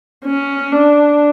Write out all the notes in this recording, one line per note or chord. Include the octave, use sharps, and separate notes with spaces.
C#4
D4